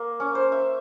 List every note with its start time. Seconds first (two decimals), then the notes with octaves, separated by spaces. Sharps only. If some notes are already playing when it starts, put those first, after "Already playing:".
Already playing: A#3
0.20 C#4
0.35 C5
0.52 E5